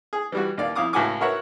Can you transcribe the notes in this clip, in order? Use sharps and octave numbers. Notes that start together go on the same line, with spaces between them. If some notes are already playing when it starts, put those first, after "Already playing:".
G#4
E3 G3 F#4
D#2 D5 F5
F2 E4 F5 D6 D#6
C#2 A2 F#4 F#5 G#5 D6
F#4 A#4 B4 C#5 E5 F#5